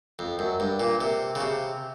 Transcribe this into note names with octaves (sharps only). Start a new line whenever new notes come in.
F2
F#2
G2
A#2
C3
C#3
C3